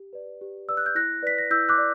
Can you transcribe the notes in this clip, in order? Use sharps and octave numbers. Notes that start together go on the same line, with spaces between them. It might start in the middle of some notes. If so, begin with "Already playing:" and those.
Already playing: G4
B4 D5
G4
B4 D5 E6
F#6
G6
E4 F#6 A#6
B4 D5 B6
A#6
E4 E6 G6
D6 F#6
D5